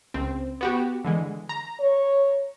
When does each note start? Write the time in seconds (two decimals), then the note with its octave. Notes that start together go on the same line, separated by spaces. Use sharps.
0.14 C#2 C4
0.61 B3 F#4 G4
1.04 D3 E3 G#3
1.49 A#5
1.80 C#5